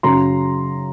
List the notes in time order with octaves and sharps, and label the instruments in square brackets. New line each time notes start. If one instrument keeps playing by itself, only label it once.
[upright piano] F#2 C#3 F#3 A#5 C6